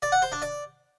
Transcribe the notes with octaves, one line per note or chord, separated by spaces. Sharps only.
D5
F#5
C5
D4
D5